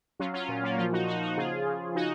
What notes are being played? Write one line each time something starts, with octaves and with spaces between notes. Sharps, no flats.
F#3 C#4 F4
C#4 F4
A#2
A#3 C#4
F3 C#4 F4
D#4 F#4
F3 D#4 F#4
D#4 F#4
C#3 F4 G#4
C#3
C#3 D#4 F#4